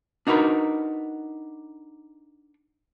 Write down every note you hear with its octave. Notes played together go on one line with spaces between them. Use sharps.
D4 D#4 F#4 A#4 B4